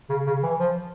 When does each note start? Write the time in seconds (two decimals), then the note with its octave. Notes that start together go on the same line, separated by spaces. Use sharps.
0.10 C#3
0.27 C#3
0.43 E3
0.59 F3